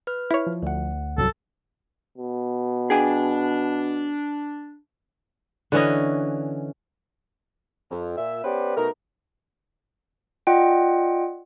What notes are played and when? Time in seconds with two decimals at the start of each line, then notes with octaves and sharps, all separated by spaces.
0.07 B4 F6
0.31 E4 C#5
0.47 F3
0.63 D2 F#5
1.18 C2 G2 F#3 A4
2.18 B2
2.90 D4 G#4 G5 G#5
5.72 D3 E3 C#4 D#5
7.90 F2
8.16 A#2 E5
8.44 B3 C#4 G4 B4 C5 D5
8.76 B2 A3 D#4 A#4
10.47 F4 D5 D#5 F#5 G5